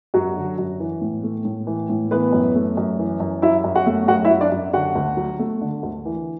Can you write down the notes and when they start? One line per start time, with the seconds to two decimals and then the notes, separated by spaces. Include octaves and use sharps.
0.14 F#2 F#3 F#4
0.36 D3
0.58 F#2
0.80 E3
1.02 A2
1.23 A3
1.45 A2
1.67 E3
1.89 A2
2.11 E3 B3 B4
2.33 F#2
2.55 A3
2.77 F#2
2.99 E3
3.20 F#2
3.42 F#3 E4 E5
3.64 F#2
3.75 F#4 F#5
3.87 A3
4.08 F#2 F#4 F#5
4.25 E4 E5
4.30 F#3
4.41 D4 D5
4.52 F#2
4.73 D3 F#4 F#5
4.95 D2
5.17 F#3
5.39 A3
5.61 D3
5.83 D2
6.06 E3